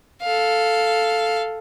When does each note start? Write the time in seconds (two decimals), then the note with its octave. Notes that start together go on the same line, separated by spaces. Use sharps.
0.22 A4 F5